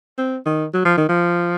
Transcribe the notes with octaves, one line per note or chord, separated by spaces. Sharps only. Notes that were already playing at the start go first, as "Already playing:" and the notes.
C4
D#3
F#3
F3
D#3
F3